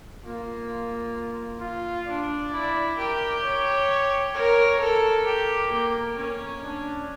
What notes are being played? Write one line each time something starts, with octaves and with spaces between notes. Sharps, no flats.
A#3 F4
F4
D4 D5
E4
G4 A#4
C#5
A#4 C#5
A4 A#4
G4
A#3
C#4
D4